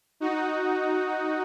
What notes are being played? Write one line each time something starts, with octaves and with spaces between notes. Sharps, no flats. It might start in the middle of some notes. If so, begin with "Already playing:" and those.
D#4 F#4